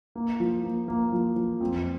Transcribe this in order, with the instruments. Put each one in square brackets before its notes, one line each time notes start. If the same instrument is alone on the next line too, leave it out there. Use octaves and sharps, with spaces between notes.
[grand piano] A#3
F3
A#3
A#3
F3
F3
F2